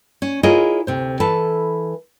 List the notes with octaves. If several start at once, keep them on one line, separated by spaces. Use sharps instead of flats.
C#4
E4 F4 G#4 A#4 C#5 D#5
D2 C3 C5
E3 A4 B4 A5